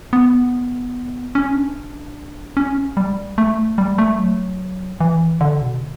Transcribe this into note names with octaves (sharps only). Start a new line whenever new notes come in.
B3
C#4
D4
C#4
G3
A3
G3
A3
F#3
E3
D3
B2